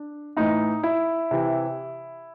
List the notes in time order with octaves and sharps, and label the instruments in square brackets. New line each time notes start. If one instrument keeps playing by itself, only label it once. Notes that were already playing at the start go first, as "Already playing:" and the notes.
Already playing: [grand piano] D4
A2 E3 D#4
E4
C3 E3